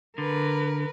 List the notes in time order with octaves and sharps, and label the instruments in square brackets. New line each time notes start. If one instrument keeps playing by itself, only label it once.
[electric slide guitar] D3 [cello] A#4 B4